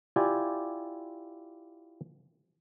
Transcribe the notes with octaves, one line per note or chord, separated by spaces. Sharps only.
E4 F4 G4 D5 G#5